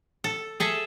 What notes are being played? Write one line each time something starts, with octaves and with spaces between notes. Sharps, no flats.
A4
G#4 A4 E5